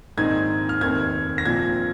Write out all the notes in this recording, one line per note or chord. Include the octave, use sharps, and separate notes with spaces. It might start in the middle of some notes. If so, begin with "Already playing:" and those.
A#1 G#2 D#3 C4 D#4 G#6
F6
F1 D#2 D#3 C4 G#6
A#6
A#1 A#2 F3 C4 G#6